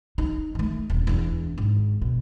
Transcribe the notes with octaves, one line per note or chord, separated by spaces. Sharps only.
D#4
D#3 A3
D#1
E2 D4
G#1
B2